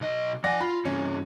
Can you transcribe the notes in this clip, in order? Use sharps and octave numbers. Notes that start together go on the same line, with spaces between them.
B1 D#5
F3 D5 F#5 G#5 A#6
F4 B5
G2 E3 C#4